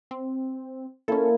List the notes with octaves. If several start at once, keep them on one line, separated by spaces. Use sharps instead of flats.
C4
A#3 C#4 E4 A4